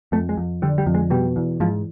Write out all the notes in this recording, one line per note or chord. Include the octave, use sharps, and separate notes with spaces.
F2 A3
G#3
F2
D3 G3
G3
F2
G#3
B2 G3
E2
G#2 F3